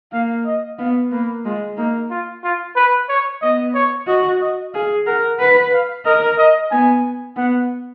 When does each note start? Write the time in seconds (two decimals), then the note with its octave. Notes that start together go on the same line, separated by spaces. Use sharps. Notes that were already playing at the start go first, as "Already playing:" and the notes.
0.12 A#3 F5
0.46 D#5
0.79 B3 F5
1.11 A#3 B4
1.45 G#3 F4
1.77 A#3 D#4
2.10 F4
2.43 F4
2.76 B4
3.09 C#5
3.42 B3 D#5
3.74 C#5
4.07 F#4 D#5
4.41 D#5
4.74 G#4 F5
5.06 A#4 F#5
5.39 B4 F#5
5.73 F5
6.05 A#4 D#5
6.38 D#5
6.71 B3 G#5
7.37 B3 F#5